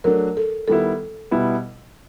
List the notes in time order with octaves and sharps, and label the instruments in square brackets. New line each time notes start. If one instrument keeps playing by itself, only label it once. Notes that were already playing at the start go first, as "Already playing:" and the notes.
[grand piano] F#3 A3 D4 [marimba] A#4
[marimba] A4
[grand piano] D#3 G3 B3 E4 [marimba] A4
[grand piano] B2 G3 B3 E4